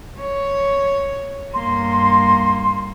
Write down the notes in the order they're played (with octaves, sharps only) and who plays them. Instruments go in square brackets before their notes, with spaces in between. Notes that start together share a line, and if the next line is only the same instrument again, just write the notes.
[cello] C#5
[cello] G2 A#3 [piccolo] C6